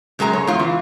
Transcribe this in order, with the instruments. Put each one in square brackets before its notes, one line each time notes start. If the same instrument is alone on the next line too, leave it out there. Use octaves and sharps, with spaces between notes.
[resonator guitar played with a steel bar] F#2 G#3 A#4 G#5 A#5
C#5
E2 F4
E3